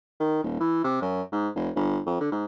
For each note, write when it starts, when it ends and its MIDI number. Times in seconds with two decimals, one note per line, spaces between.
0.20 0.42 51
0.43 0.60 27
0.60 0.84 52
0.84 0.98 48
1.02 1.22 42
1.32 1.49 44
1.55 1.70 29
1.76 2.00 31
2.06 2.17 41
2.21 2.31 50
2.32 2.45 44